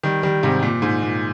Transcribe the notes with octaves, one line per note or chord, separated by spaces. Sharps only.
D#3 G3
D#3 G3
G#2 C3
A#2
G#2
A#2